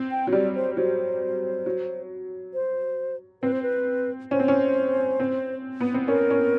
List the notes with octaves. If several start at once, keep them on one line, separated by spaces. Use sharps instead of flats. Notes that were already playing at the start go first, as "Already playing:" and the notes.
Already playing: C4
G5
F#3
G3 D5
C5
F#3 C5
F#3
C5
C4 B4
C5
B4
C#4 C5
C4
C#4
C4
B3
C4
C#4 A#4
C#4